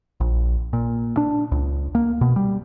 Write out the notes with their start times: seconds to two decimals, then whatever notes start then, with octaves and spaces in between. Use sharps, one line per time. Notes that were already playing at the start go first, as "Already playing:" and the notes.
0.20 A#1
0.73 A#2
1.17 D4
1.52 C#2
1.95 A#3
2.21 B2
2.36 G3